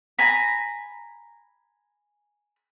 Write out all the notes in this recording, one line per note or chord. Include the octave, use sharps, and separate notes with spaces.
G#5 A#5 B5